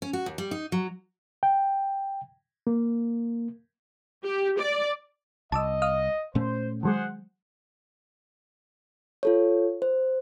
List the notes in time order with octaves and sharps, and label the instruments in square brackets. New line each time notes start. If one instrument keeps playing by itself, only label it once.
[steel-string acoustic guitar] C#4
F#4
D#2
G3
D#4
F#3
[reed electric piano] G5
A#3
[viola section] G4
D5
[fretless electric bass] C2 [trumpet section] D#5 [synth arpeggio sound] A5 D6 E6
[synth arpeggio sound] F5 D#6 F6
[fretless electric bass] A#2 A3 C#4 [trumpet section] C5
[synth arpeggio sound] D#3 F#3 G#3 [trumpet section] G#4 C5 F#5
[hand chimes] F4 A4 C#5
C5